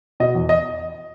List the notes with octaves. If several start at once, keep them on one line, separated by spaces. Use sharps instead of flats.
B2 D#5
E2
D#5